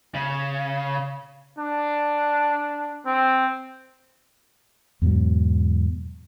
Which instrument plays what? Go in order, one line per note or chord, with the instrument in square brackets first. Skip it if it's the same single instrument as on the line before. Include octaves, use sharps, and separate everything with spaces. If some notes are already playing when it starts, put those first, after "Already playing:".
[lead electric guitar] C#3
[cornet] D4
C4
[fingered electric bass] E2 G#2 B2 F#3